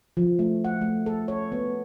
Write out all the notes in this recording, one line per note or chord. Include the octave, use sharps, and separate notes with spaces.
F3
A3
F#5
A3
A4
C#5
B3